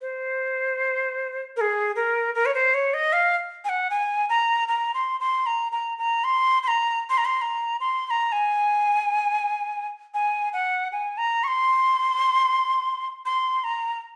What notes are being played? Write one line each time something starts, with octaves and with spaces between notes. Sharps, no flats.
C5
A#4
G#4
A#4
A#4
C#5
C5
C#5
D#5
F5
G#5
F#5
G#5
A#5
A#5
C6
C6
A#5
A#5
A#5
C6
C6
A#5
C6
A#5
C6
A#5
C6
C6
A#5
G#5
G#5
F#5
G#5
A#5
C#6
C6
C6
A#5